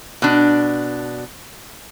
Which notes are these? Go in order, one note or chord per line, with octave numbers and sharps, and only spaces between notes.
B2 D4